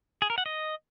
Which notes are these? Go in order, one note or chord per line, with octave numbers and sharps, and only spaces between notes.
G#4
A#4
F#5
D#5